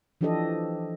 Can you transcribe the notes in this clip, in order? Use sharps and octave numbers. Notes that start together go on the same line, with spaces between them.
E3 F3 D4 G4 A4 D#5